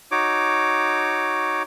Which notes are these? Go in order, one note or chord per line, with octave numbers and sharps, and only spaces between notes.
D#4 F#4 C#5 D6